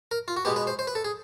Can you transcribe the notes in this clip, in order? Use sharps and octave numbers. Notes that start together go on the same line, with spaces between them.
A#4
F4
F#4
B2 G#3 B3 G4
B4
C5
C5
B4
A4
G#4